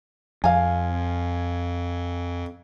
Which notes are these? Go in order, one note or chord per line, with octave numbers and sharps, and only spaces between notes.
F2 F5 G#5